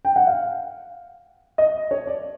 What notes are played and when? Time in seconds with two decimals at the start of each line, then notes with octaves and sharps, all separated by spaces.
0.05 G5
0.16 F#5
0.27 F5
1.58 D#5
1.91 C#5
2.07 D5